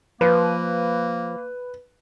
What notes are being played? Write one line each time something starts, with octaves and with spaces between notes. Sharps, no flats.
F3 A#3 B4